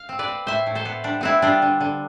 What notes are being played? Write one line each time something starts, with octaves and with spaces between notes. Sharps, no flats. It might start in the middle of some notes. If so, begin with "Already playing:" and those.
Already playing: F5
C4
B4 D5
C4
A2 C5 E5
A2
A4 C5
B3
G3 D4
B3 C4 E4
G3 D4 F4
D3
D3